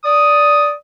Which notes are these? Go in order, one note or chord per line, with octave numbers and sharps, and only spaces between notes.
D5 D#6